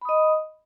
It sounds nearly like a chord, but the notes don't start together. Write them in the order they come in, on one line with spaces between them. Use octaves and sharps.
B5 D#6 D#5